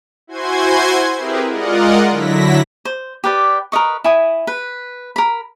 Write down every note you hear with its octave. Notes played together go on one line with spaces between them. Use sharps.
E4 F#4 C5 G#5 C6 G#6
C4 E4 G4 G#4 A#4 B4
G#3 F4 A#4 D5 D#5 F#5
D3 F#3 E4 A#6 B6
C5
G4 B4 D5
A#4 B4 D#5 C#6
E4 G#5 D#6
B4
A#4 B5